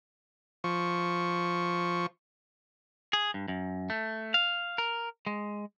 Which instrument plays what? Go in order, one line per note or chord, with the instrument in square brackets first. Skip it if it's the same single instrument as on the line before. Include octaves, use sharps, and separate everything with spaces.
[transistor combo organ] F3 C#6
[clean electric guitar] G#4
G2
F#2
A3
F5
A#4
G#3